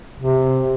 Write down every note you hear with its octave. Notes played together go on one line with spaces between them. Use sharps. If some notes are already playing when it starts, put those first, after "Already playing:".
C3